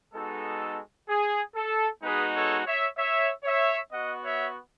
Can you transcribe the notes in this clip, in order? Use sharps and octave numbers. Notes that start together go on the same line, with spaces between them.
G#3 B3 D#4 F#4 A4
G#4
A4
G#3 B3 D#4 F#4 G#4 B4
A4 C#5
C#5 E5
C#5 E5
C#5 E5
B3 F#4 D#5 F#5
C#5 E5